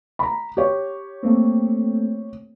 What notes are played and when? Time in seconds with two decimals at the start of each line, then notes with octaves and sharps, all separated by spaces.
0.19 A#5 B5
0.57 G4 C#5
1.23 A3 A#3 C4